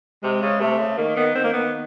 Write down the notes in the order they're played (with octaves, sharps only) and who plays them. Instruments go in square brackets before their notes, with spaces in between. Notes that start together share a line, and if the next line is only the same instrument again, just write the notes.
[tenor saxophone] C3 [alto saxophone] G#3
[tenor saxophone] C#3
[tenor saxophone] C3 [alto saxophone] A3
[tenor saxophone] C#3
[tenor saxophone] D#3 [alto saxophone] A#3
[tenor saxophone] D#3 [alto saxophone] B3
[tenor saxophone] D#3 [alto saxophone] C4
[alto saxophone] A#3
[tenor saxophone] D#3 [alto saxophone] B3